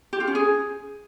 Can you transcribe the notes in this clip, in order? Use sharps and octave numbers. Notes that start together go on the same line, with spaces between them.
G4
F4
C#4
G#4